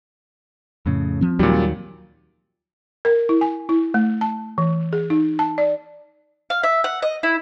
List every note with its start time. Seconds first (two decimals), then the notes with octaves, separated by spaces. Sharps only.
0.86 F2 A2 C#3
1.21 F3 C4
1.39 D#2 A#2 D#3 F#3 G3
3.05 A#4
3.29 E4
3.41 G#5
3.69 E4
3.94 A3
4.21 A5
4.58 E3
4.93 G#4
5.10 D#4
5.39 A5
5.58 D5
6.50 F5
6.63 E5
6.84 F#5
7.02 D#5
7.23 E4